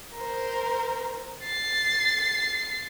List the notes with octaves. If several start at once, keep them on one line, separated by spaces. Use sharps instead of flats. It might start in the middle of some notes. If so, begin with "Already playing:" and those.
A#4 C5
A6 C7